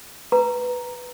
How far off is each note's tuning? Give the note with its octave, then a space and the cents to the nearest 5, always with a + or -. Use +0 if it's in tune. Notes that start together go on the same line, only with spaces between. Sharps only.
B4 +0 A#5 +0